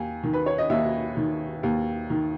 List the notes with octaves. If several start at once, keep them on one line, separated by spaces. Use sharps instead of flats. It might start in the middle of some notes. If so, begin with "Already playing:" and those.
Already playing: D#2 G#5
D#3
B4
C#5
D#5
D#2 E5
D#3
D#2
D#3